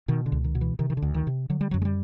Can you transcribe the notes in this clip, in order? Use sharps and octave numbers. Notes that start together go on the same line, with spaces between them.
B2 D#3
D3
C#2
D#3
B2
E3
C3 D#3
D#3
D3
D2
D#3
C3
D3 F#3
G3
F#2 F#3
G#3
G3